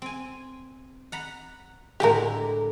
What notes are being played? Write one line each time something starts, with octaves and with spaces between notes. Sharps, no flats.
C4 G#5
F#5 A#5 B5
A2 D3 G#3 G4 A#4